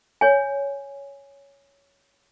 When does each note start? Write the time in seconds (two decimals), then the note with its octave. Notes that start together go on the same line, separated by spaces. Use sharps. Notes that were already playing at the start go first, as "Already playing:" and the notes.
0.21 C#5 G#5